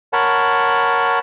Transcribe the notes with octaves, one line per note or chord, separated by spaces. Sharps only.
A#4 C#5 F#5 A5 B5